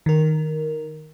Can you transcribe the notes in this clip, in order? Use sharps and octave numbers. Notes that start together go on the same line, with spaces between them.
D#3 A#4